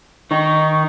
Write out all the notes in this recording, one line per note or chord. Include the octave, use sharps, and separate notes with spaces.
D#3 D#4 C#6